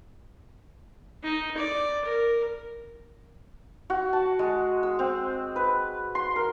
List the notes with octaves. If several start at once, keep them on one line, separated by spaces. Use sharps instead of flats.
D#4
D5
A#4
F#4
A5
G#3
E6
C4
B4
C6
A#4